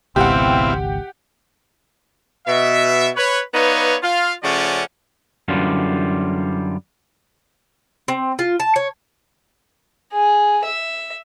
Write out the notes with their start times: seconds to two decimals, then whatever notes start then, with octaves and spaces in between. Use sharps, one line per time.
0.16 G#1 C#2 B2 C4 E4 G4 F5 F#5
2.47 B2 E5
3.16 B4 C#5
3.54 B3 D#4 B4 C#5 D5 F5
4.03 F4 F5
4.43 C#3 F3 A3 C#4 D5 F#5
5.48 F#2 D3 E3 G3 F4
8.08 C4
8.39 F4
8.60 A5
8.76 C#5
10.13 G#4
10.64 E5